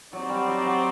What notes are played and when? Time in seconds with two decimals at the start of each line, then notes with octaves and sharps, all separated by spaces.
0.13 F#3 C4 D#4 G4 D5
0.29 G3
0.47 F#3
0.65 F#3